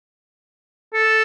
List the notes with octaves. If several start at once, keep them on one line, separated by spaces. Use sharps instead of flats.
A4